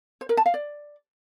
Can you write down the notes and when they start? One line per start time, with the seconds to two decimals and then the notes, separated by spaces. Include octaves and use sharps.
0.21 C5
0.29 A#4
0.37 A5
0.46 F5
0.54 D5